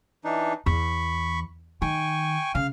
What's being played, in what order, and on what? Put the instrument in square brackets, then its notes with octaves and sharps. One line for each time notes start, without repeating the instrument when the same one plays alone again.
[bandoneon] E3 D4 D#4
[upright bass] E2 [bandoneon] B5 C#6
[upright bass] D#3 [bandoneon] G5 G#5 C#6
[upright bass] C#3 [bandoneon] F5 F6